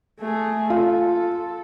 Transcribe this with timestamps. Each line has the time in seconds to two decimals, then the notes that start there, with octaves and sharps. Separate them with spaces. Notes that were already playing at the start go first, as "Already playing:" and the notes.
0.20 A3 G#4
0.70 F4 A4